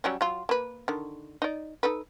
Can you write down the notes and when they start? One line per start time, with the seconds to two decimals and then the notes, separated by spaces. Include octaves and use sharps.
0.04 F#3 G3 C#4
0.21 F#3 F4
0.49 A#3 B4
0.88 D3 D#3
1.42 D#4 D5
1.83 D#4 A4 B4